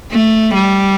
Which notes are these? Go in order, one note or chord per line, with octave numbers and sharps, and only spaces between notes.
A3
G3